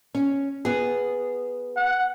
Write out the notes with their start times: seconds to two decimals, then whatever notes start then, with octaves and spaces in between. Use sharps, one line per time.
0.14 C#4
0.65 B3 G#4
1.76 F#5